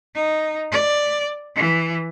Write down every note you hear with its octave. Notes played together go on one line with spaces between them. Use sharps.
D#4
D5
E3